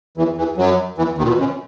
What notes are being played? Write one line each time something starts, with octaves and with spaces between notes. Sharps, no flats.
E2 E3
E2 E3
F#2 F#3
E2 E3
D#2 D#3
A#2
B2
F#2